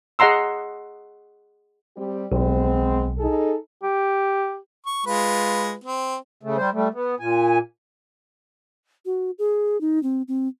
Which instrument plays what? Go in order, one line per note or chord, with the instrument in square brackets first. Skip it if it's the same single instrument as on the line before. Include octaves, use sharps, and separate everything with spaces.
[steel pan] G#4 D#5 F#5 A#5 C6 E6
[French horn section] G3 C4 G4
[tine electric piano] B1 [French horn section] G#3 B3 C4
[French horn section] D#4 G#4 A4
[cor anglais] G4
[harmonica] C#6
G#3 F4 B4
C4
[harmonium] C#3 A3
G3 C5
G3 A3
B3
A#2 G#5
[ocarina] F#4
G#4
D#4
C4
C4